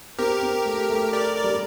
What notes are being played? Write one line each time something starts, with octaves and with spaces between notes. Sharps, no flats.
C4 G4 A#4
C4
A3
A3
A#4 D5
A#4 D5
G3